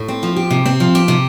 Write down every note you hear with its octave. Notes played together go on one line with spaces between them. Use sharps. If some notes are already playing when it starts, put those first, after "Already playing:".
Already playing: A2
C4
F3
G4
C3
C4
F3
G4
C3